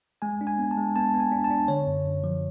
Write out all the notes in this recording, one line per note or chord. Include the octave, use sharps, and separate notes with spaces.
G#3 G#5
D4
G#5
B3
A5
G#3
B3 A5
B3
G#5
D4
A5
D4
D3 C#5
F#2
F#2
F3